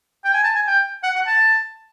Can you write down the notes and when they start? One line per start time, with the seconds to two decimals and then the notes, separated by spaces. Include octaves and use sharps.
0.25 G5
0.34 G#5
0.44 A5
0.56 G#5
0.67 G5
1.04 F#5
1.16 F#5
1.27 A5